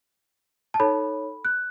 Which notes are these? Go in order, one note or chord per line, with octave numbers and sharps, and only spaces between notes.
A5
D#4 A4 C#5 B5
F#6